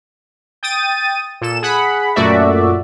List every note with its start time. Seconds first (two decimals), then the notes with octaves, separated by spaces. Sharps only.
0.63 G5 D#6 A6 D#7
1.41 A#2 A4 E7
1.62 G#4 F#5 B5
2.16 F#2 A#2 A3 F#4 D5 E5